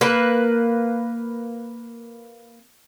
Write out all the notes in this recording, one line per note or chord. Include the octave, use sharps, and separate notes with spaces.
A#3 B4